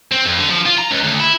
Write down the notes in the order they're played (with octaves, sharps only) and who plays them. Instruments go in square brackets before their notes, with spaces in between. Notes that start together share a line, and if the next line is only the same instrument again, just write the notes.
[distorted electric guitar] C4
F2
D3
F3
F4
A#5
C#2
D2
E4